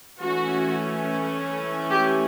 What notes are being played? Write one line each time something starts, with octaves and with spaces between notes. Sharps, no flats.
E3 A3 C#4 F#4
G4